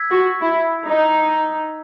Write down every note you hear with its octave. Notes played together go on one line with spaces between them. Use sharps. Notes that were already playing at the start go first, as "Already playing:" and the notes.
Already playing: E6 G#6 B6
F#4
E4
D#4